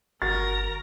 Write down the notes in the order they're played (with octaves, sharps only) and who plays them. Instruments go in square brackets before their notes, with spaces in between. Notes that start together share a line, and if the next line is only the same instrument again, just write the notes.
[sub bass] G1 [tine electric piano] F#4 [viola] A#4 A#5 [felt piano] A6